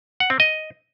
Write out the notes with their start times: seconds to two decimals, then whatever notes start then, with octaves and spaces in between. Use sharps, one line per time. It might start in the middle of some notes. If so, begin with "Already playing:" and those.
0.20 F#5
0.30 C4
0.40 D#5